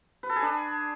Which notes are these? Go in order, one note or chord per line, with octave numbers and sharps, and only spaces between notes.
B4
A4
G#4
D4